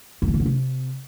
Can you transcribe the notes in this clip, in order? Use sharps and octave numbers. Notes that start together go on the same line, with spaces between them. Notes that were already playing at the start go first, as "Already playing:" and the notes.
F2
C3
C#3
D3
C3